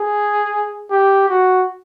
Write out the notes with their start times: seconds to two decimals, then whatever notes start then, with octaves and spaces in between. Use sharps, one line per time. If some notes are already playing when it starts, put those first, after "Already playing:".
Already playing: G#4
0.91 G4
1.29 F#4